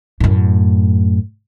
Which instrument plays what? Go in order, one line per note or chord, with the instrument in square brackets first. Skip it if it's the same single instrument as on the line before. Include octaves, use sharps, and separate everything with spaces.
[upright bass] F#2 A2